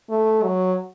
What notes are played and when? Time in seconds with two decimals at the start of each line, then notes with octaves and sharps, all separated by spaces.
0.10 A3
0.44 F#3